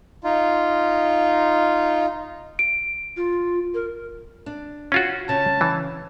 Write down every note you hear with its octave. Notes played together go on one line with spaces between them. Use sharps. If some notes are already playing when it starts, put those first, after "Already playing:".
D#4 F4
D7
F4
A#4
D4
C#4 F4 F#4
C#3 A5
E3